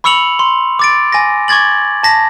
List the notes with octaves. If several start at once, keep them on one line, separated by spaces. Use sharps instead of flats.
B5 C#6 E6 C#7 F7 F#7
C6
D6 A6 D7
G#5 A#6
C#6 D6 G#6 A6 F#7
A5 A#6 B6